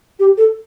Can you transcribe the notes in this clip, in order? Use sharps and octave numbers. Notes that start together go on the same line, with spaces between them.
G4
A4